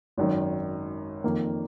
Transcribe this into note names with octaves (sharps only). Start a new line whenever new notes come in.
G#1 F#2 D#3
F2 D#3 A#3